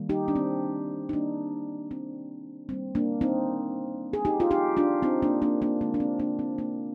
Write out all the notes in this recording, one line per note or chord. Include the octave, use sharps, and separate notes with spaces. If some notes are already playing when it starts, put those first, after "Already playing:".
Already playing: D#3 G3 A#3
D#4 G4
D4
C4
D#4
A#3 D4
C4
D#3 G3 A#3 C4
A#3 D4
C4 D#4
G#4
D#4 G4
F4
D#4 G4
D4 F4
C4 D#4
A#3 D4
A#3 D4
A#3 D4
D3 G#3 A#3
D4
C4
A#3 D4
C4
A#3